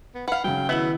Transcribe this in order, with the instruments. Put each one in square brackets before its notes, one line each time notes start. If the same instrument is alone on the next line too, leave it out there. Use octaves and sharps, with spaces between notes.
[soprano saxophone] B3
[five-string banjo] B4 F5 [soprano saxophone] F#5
[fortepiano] C#3 F#3 [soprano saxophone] G5
[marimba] D#3 E4 E6 [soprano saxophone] B3 [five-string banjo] E5